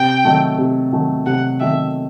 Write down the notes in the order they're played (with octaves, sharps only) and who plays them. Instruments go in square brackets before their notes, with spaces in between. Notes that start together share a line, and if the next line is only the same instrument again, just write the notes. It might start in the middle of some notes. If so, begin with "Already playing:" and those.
Already playing: [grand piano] C3 [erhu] G5
[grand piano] D#3 F#3 A3
C3
D#3 F#3 A3
[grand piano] C3 [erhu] F#5
[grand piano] D#3 F#3 A3 [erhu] E5